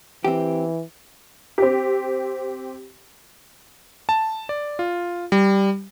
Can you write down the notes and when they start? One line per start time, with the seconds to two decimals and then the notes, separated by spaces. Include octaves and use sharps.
0.25 E3 C4 G4
1.58 C4 G4
4.09 A5
4.49 D5
4.79 F4
5.32 G3